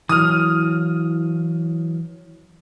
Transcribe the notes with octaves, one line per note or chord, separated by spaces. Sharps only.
E3 F#3 D#6 F6